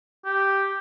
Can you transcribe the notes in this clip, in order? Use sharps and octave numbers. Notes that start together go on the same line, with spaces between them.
G4